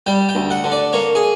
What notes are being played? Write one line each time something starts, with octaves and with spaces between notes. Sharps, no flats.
G3 G5
G5
D2
F#5
D3
D5
A#3 C#5
G#4